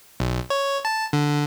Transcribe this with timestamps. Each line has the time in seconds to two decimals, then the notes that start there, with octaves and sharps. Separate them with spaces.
0.20 B1
0.50 C#5
0.85 A5
1.13 D3